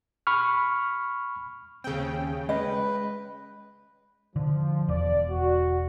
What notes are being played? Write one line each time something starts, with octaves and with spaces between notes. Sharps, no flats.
B5 C#6 F6
D#2 C#3 C4 G5
G#3 C#4 B4 D#5
D3 F3
E1 D5
F#4